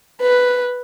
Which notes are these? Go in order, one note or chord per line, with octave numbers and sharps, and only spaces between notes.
B4